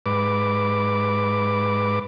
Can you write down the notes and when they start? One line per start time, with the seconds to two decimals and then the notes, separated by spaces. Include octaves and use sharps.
0.06 G#2 B4 D6